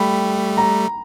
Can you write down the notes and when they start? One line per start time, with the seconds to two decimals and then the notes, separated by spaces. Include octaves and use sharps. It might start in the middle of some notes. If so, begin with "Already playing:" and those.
Already playing: G3 A3 G5 B5
0.57 A#5